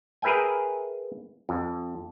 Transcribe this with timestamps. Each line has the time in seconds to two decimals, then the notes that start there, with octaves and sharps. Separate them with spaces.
0.22 G#4 A#4 B4 E5 G5 G#5
1.49 F2